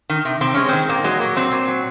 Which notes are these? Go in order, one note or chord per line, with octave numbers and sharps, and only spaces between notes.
D#3
C3
C3 C4
G#3 C#4
D#3 C4
A#2 A#3
F#3 G#3
F#3 A#3
A#2 C4
A#2
F#3